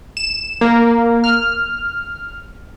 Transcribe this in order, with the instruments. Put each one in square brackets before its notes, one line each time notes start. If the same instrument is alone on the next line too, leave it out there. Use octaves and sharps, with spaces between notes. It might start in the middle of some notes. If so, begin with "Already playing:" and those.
[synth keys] E7
A#3
F6